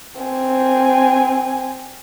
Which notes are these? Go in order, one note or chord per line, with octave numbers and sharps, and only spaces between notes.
C4 G#5